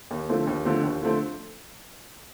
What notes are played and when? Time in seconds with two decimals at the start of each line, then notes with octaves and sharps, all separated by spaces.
0.11 D#2
0.29 D3 F3 A3 C4
0.47 D#2
0.65 D3 F3 A3 C4
0.84 D#2
1.01 D3 F3 A3 C4